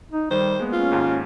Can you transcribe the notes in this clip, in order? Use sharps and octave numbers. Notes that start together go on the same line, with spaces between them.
D#4
D#3 G3 C5
G#3 A#3 B3
C#4 F4
D#2 G#2